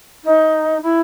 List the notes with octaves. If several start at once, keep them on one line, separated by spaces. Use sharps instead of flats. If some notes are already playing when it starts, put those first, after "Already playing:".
D#4
E4